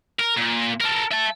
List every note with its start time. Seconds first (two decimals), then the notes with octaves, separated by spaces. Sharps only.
0.20 A#4
0.37 A#2
0.81 A4 A#4
1.12 E5 A5